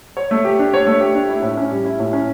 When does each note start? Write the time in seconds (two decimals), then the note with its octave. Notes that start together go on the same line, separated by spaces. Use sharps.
0.17 C#5
0.31 A3
0.45 G4
0.59 D4
0.74 C#5
0.87 A3
1.01 G4
1.15 D4
1.29 E4
1.42 A2
1.57 C#4
1.70 G3
1.85 E4
2.00 A2
2.13 C#4